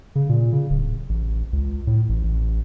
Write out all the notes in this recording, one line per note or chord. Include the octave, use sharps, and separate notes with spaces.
C#3
A#2
C#3
D1
A1
C#2
A2
A1
A1